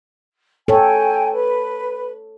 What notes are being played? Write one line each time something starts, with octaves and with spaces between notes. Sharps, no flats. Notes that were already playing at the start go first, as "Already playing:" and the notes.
A4 C#5 G5 G#5
B4